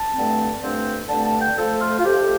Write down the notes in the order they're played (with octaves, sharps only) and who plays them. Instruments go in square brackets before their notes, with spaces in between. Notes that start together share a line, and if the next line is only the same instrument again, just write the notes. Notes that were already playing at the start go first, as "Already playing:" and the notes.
Already playing: [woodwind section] A5
G2 D3 A3 C4
G2 D3 A3 C4
G2 D3 A3 C4 A5
A5
G5
F2 F3 A3 A4
F4
F4
F2 F3 A3 G4